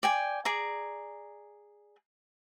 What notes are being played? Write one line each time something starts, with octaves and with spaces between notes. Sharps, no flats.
D5 G5 G#5
G#4 D5 A#5